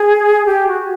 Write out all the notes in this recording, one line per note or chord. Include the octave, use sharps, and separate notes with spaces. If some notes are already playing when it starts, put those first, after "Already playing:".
Already playing: G#4
G4
F#4